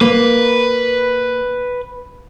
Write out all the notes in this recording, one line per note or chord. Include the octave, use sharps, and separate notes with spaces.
A#3 B4